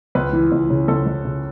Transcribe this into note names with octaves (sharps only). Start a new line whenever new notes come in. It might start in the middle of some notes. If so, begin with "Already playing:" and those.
C#2 B4
E3
C#2
C#3
C#2 A4
C#2
C#3